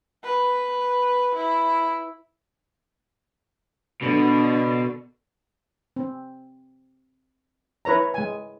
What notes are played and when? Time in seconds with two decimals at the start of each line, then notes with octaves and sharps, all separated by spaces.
0.23 B4
1.35 E4
4.02 B2 D3
5.96 C4
7.85 E4 B4 C#5 A#5
8.14 G#3 G#5